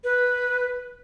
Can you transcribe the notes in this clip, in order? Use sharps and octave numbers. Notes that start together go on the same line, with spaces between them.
B4